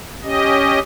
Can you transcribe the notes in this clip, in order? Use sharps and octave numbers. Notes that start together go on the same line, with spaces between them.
C#4 G4 D#5